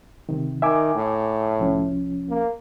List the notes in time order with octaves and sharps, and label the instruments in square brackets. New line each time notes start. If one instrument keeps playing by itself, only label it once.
[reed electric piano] C3 D#3
[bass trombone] D#3 [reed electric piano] E5 G#5 D6
[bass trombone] A2
[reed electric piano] C2 F3 C#4
[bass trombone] A#3